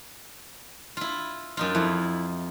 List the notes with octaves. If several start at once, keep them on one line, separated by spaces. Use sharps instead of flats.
E4 F4
F#2 D#4 F4
F2 E4